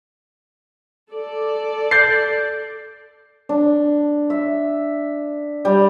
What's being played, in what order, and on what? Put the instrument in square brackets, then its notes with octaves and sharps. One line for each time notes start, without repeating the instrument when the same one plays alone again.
[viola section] A4 D5
[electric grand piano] G6 A6 C7
[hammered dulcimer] D4
E5
G3